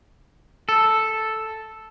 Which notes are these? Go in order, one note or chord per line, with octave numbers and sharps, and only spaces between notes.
A4